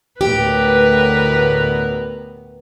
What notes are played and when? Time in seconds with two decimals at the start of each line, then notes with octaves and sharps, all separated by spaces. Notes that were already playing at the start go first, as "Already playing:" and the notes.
0.21 D2 A2 B3 G4 A#4 B4